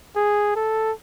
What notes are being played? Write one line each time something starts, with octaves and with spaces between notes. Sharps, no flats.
G#4
A4